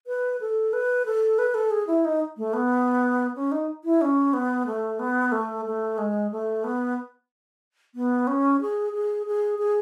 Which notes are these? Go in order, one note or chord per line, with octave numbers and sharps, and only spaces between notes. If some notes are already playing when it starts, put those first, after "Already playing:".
B4
A4
B4
A4
B4
A4
G#4
E4
D#4
A3
B3
C#4
D#4
E4
C#4
B3
A3
B3
A3
A3
G#3
A3
B3
B3
C#4
G#4
G#4
G#4
G#4